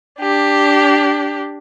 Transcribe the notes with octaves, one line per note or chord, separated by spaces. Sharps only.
D4 G4